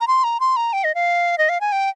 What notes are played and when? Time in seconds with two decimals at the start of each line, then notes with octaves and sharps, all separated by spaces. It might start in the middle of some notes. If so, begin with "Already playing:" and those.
0.01 A#5
0.08 C6
0.24 A#5
0.40 C6
0.56 A#5
0.73 G5
0.84 D#5
0.95 F5
1.38 D#5
1.49 F5
1.61 G#5
1.72 G5